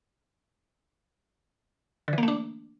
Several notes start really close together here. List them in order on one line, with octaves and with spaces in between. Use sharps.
D3 E3 A#3 A3 D4